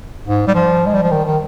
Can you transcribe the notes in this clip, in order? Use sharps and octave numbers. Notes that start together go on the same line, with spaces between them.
G#2
G3
F3
G#3
G3
F3
D#3
D#3